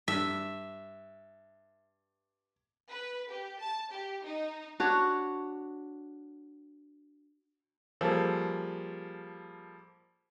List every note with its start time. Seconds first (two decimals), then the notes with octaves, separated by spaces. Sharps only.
0.08 G2 E5
2.89 B4
3.29 G4
3.59 A5
3.91 G4
4.22 D#4
4.80 D4 F#4 C#5
8.01 F3 G3 A#3 G#4 A4